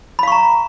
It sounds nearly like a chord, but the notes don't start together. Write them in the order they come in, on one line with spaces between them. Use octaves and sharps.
B5 F5 C#6 A#5